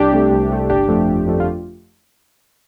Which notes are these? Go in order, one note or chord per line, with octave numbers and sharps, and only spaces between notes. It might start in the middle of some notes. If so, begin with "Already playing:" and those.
Already playing: C2 D4 G4
C3 A3
C2
C3 A3
G1 D4 G4
F2 F3 A3
G1
F2 F3 A3
F4